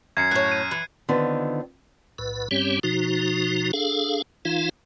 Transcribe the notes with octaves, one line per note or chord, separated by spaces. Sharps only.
F#2 G#6 C7 C#7
A2 C#5 F#6
D#7
E3
D3 D#3 B3 C4 F4 B4
B1 A2 B4
G2 G3 C4 C#4 G4 C#5
B2 F3 D#4 F#4
D4 G#4 A4 F5
E3 D#4 F4 F5